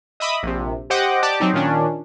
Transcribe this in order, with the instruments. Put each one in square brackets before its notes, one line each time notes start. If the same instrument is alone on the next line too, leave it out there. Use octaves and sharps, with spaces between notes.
[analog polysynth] D#5 E5 B5 D6 D#6
A#1 C3
G4 C5 D#5 F#5 G5 D6
G4 D5 A5 D6
F#3 C4 D#4
A#2 D#3 C#4 D4